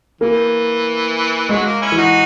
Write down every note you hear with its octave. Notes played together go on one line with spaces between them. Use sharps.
E3 A#3
F#3 G#3
A#3
C#4 E4
E3
D#4 F#4